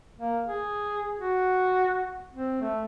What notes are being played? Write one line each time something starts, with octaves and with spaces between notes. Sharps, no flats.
A#3
G#4
F#4
C4
A3